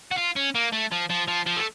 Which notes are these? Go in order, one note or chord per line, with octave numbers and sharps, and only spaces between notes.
F#4
F4
C#4
A#3
A3
F3
F3
F3
F3
A3